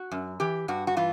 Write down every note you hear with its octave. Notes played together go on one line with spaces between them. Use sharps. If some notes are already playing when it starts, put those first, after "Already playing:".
Already playing: F#4
F#2
E3 G4
G2 F#4
F#4
E3 F4